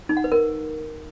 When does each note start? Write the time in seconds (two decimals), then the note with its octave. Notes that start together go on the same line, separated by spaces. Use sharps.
0.09 D#4
0.17 F#5
0.24 B4
0.32 A#4